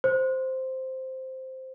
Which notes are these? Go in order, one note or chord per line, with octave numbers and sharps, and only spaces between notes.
C5